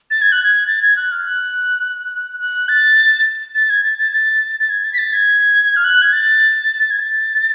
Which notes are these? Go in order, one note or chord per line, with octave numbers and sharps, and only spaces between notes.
A6
G#6
F#6
G#6
A6
G#6
F#6
F6
F#6
F#6
A6
A6
G#6
A6
A6
A6
A6
G#6
A6
B6
A6
G#6
F6
F#6
G#6
A6
G#6
A6